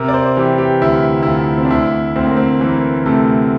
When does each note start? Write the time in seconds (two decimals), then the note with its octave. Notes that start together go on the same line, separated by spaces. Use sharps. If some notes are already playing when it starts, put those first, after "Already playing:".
Already playing: C3 A#4
0.08 D5
0.13 C5
0.36 E3 G4
0.58 G4
0.81 D2 E4
1.23 E4
1.26 D2 F4
1.57 C4
1.64 D4
1.70 D2 E4
2.16 D2 C4
2.26 A#3
2.36 C4
2.61 E3 A#3
3.06 C3 A3